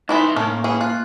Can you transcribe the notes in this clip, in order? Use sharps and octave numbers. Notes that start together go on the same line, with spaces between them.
C2 E3 D#4 E4 E5 C6
A2 A3 A#3 C#4 A#4
E3 C#4 G#4
F4 F#6